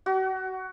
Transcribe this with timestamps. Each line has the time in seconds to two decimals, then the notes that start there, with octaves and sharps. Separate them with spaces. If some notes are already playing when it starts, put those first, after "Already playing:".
0.06 F#4